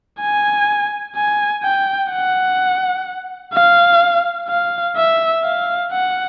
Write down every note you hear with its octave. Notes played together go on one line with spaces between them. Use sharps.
G#5
G#5
G5
F#5
F5
F5
E5
F5
F#5